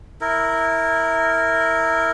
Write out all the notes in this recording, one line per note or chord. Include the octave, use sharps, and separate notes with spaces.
E4 A#4